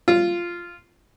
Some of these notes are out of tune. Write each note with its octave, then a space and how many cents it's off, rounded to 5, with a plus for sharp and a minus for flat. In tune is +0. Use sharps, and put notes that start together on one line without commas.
F4 -10